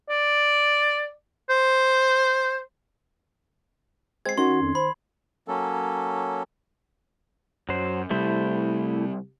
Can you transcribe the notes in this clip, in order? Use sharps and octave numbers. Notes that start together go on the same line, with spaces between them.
D5
C5
G#3 C4 G#6 C7
D#3 C#4 F#4 C6
F2
C5 B5
F#3 A#3 C#4 A4
F#2 F#3 C5
C3 G3 A3 E4 C5